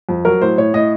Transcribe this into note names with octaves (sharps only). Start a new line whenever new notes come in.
F2
F#3 A#4
A2 C5
A2 C#5
A2 D#5